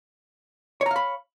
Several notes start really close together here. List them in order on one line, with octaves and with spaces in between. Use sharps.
C#5 A#5 F5 B5